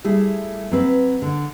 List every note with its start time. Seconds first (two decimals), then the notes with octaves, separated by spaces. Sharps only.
0.04 G3 A3 E4 G#4
0.71 F#3 C4 B4
1.22 D3